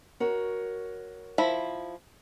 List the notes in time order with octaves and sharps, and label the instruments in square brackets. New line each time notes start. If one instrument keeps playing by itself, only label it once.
[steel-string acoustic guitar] F#4 A#4 C#5
[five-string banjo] F3 E4 B5